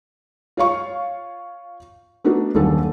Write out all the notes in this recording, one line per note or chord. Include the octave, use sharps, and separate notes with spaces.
F4 C#5 F5 C#6
A3 B3 D4 D#4 F#4
D#1 F#2 D3 D#3 A4